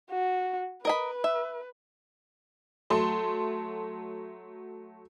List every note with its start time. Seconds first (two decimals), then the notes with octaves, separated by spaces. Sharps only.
0.11 F#4
0.85 A#4 B4 D#5 B5
1.24 E5
2.90 F#3 A3 A5 C6